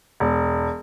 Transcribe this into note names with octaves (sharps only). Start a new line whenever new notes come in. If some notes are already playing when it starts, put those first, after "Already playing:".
E1